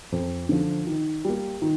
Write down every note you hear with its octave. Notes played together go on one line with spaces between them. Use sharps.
F2
D3 F3
D#3
G3 A#3
D#3